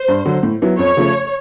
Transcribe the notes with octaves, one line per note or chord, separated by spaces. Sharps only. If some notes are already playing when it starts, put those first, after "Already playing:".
Already playing: C5
G2
D3 F#3
A2
F#3 B3 E4
F2 C#5
C#3 F3 A3